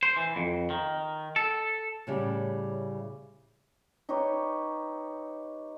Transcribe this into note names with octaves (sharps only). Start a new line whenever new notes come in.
C5
E3
F2
D#3
A4
A2 C#3 G3
D#4 G4 B4 C#5